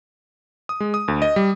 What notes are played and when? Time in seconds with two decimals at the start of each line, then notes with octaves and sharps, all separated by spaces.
0.69 D#6
0.80 G#3
0.94 D#6
1.08 D2
1.22 D#5
1.36 G3